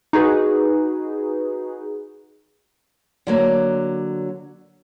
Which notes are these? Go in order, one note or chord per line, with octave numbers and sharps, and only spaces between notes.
D#4 F#4 G#4 B4
D3 F#3 A#3